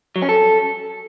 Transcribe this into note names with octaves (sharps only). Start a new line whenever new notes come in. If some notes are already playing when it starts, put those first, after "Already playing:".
F#3
C#4
A4